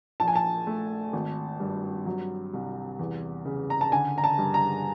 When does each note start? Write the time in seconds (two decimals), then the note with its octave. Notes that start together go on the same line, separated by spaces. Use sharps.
0.20 A#1 A5
0.28 G#5
0.36 A5
0.67 A3
1.13 G#1
1.60 G2
2.06 F#3
2.53 C2
2.99 E2
3.45 C#3
3.70 A#5
3.81 A5
3.92 D3 G#5
4.18 A#5
4.24 A5
4.38 G2
4.54 A#5